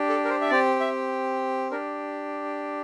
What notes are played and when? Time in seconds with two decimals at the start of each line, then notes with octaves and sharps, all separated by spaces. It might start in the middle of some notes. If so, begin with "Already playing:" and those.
Already playing: D4 G4
0.09 A4
0.25 A#4
0.30 C5
0.41 E5
0.50 C4 G4 D5
0.80 E5
1.71 D4 G4 A#4